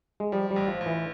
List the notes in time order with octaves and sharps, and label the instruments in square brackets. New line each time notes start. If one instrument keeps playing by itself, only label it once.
[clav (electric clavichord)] G#3
[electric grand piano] F3 [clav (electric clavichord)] G3
[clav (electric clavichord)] G3
[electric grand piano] A1
[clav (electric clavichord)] F3
[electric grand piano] A1
[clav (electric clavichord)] E3